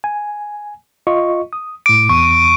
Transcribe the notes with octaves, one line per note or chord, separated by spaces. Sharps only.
G#5
F4 D#5 C#6
D#6
A2 D6 D7
E2 C#6